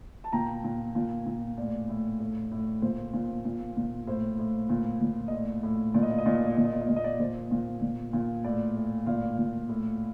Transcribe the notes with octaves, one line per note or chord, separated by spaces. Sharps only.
A5
A#2 G5 A#5
A#2
A#2
A#2
A2 D5
A2
A2
A2
A#2 C5
A#2
A#2
A#2
A2 C5
A2
A#2
A#2
D#5
A2 D5
A2
A#2 D5
D#5
D5
D#5
A#2 D5
D#5
D5
D#5
A#2 D5
D#5
D5
D#5
A#2 D5
D#5
D5
A#2 C5
A#2
A#2
A#2
A2 D5
A2
A#2 D5 F5
A#2
A2